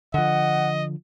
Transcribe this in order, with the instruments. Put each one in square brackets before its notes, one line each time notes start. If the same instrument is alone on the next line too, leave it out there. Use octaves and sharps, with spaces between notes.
[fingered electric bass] D3 F3 [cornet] D#5 [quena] F#5